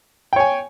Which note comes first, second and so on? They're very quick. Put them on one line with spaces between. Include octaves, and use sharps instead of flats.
G5 C#5 G#5